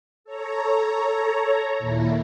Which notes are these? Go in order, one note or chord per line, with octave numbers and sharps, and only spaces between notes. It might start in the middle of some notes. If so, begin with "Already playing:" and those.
A4 C#5 A#5
D#2 A#2 E4